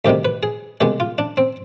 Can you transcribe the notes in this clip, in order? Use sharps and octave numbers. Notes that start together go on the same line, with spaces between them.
D2 C3 D#3 G3 G4
B4
G#4
C2 B2 G#3 G4
F4
D4
C4